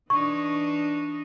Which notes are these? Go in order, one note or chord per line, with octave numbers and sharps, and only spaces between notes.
E3 D4 D#4 C#6